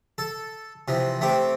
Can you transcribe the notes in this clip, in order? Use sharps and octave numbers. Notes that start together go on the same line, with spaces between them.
A4
C3 E3 F3
A3 C4 G4